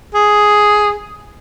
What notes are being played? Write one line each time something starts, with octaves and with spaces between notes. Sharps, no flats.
G#4